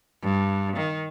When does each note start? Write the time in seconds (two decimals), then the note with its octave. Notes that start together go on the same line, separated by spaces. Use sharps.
0.22 G2
0.76 D#3